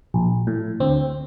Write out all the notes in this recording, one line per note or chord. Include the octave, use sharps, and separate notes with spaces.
A#1
A2
D2 C4